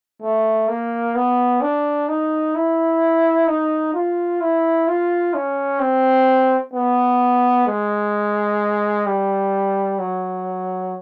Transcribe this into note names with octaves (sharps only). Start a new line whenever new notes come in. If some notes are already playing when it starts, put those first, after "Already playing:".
A3
A#3
B3
D4
D#4
E4
D#4
F4
E4
F4
C#4
C4
B3
G#3
G3
F#3